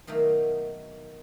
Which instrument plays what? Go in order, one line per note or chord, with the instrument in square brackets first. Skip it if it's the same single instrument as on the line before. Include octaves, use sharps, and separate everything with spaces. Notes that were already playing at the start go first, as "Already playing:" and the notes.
[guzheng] B2 D#3 F#3 A3 A#3